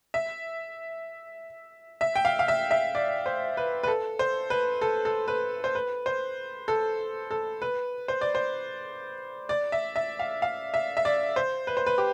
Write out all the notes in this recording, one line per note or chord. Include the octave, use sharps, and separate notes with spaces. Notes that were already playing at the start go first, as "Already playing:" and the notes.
E5
E5
G5
F5
F5
E5
E5
D5
C5
B4
B4
A4
C5
B4
A4
A4
B4
C5
B4
C5
A4
A4
B4
C5
D5
C5
D5
E5
E5
F5
F5
E5
E5
D5
C5
B4
C5
B4
G4